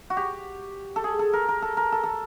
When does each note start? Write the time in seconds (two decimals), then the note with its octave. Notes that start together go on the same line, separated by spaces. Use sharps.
0.10 F#4
0.17 G4
0.96 A4
1.04 G#4
1.19 A4
1.33 A#4
1.48 A#4
1.62 A4
1.77 A#4
1.92 A4
2.03 A4